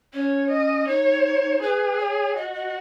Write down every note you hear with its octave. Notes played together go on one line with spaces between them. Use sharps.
C#4 C#5
D#5
D#4 C#5
G#4 B4
C#5
F#4 D#5
D#5